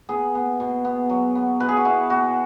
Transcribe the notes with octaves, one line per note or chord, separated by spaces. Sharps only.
B3 G#4
B3
B2
B3
F#3
B3
B2 B4
G#4
F#4
B3 E4
B2 F#4